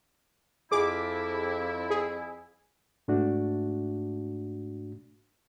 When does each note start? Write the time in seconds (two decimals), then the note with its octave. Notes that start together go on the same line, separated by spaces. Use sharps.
0.72 F2 E4 G#4 D6
1.90 G#4
3.08 G#2 A3 D4 F#4